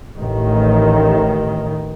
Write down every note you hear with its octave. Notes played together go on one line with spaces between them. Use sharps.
A1 D#3